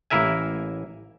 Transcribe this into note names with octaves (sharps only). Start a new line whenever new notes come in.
A1 A#3 E4 A#4 E5 G#5